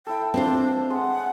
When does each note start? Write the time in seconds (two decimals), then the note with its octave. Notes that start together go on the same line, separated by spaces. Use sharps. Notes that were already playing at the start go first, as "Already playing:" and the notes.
0.07 E4 A4 G5
0.34 C4 D4 F4 C5
0.90 G#3 F#5